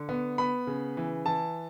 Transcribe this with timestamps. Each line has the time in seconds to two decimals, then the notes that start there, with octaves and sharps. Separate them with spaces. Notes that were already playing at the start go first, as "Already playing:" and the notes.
Already playing: D3
0.09 B3
0.38 B3 B5
0.67 C#3
0.97 E3
1.26 E3 A5